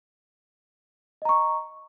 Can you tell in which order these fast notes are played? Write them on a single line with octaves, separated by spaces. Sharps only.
D#5 A#5 C#6